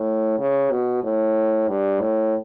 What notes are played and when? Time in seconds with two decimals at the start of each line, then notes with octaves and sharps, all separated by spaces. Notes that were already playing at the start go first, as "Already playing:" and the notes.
Already playing: A2
0.39 C#3
0.71 B2
1.04 A2
1.68 G2
2.01 A2